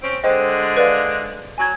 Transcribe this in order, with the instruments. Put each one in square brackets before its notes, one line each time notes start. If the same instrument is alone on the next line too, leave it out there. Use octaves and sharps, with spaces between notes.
[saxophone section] C4 C#4
[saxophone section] D3 G#3 [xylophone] C5 D#5 G5
[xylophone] B4 D5 F5
[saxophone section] F#3 [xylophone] G#5 G#6